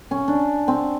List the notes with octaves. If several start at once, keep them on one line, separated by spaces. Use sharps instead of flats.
C#4
D4
C4